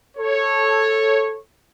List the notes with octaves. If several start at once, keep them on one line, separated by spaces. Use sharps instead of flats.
A4 C#5